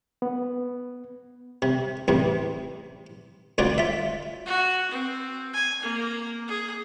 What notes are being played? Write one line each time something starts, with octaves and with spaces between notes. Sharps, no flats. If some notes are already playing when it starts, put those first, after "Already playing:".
B3
C3
A1 E2 C3
D2 C#3 F4 F#4 C5 D5
F4 E5
F#4
C4
G#5
A#3
G#4